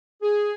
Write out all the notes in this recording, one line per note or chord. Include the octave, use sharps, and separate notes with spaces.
G#4